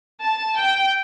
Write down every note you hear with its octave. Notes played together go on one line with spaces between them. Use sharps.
A5
G5